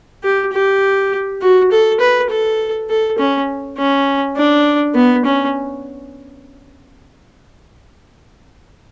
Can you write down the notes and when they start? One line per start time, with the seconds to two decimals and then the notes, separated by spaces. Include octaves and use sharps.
0.23 G4
0.53 G4
1.41 F#4
1.72 A4
2.00 B4
2.30 A4
2.90 A4
3.18 C#4
3.78 C#4
4.36 D4
4.95 B3
5.25 C#4